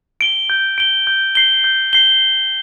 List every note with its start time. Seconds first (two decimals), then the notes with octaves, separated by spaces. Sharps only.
0.21 D7 G7
0.50 G6
0.78 D7 G7
1.07 G6
1.35 C7 G7
1.64 G6
1.93 C7 G7